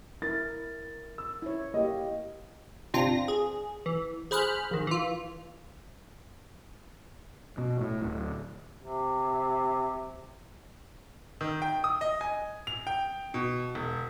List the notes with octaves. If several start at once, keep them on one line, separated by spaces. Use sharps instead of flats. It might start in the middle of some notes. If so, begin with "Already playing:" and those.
E4 A#4 A6
E6
E4 C#5
A#3 G4 D#5
G1 C3 C4 D4 F4 A#6
G#4
E3
G#4 C5 B5 F6 F#6
A#1 D#3
E3 F4
B2
A2
D1
C3
D#3
G5
D#6
D#5
G#5
F7
G5
B2
E1